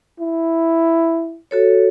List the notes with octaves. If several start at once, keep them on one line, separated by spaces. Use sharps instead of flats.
E4
F#4 A4 C#5